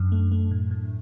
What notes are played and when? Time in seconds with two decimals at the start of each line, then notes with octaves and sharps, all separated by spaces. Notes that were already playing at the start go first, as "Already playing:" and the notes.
Already playing: F#2 D4
0.12 A3
0.32 A3
0.51 A2
0.71 A2